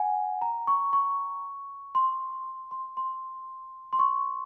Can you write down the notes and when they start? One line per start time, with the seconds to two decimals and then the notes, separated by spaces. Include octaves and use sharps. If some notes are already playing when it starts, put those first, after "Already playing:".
Already playing: F#5 G#5
0.42 A#5
0.67 C#6
0.93 C#6
1.95 C6
2.71 C6
2.97 C6
3.93 C6
3.99 C#6